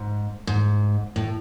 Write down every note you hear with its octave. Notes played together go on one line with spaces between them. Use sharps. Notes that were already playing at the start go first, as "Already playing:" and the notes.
Already playing: G#2
G#2
A2